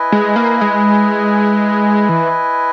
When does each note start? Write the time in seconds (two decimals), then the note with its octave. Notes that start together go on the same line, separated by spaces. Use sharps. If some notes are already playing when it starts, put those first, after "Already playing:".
Already playing: E4 B4 D#5 G#5
0.12 G#3
0.36 A#3
0.61 G#3
2.09 E3